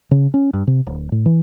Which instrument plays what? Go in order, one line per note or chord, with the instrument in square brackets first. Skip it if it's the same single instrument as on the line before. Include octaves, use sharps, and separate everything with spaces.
[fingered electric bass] C#3
C#4
G2
C3
D1
A2
E3